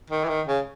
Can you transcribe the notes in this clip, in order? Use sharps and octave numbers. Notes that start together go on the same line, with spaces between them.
D#3
E3
D#3
C#3